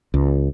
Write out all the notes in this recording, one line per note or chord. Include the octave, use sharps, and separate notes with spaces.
C#2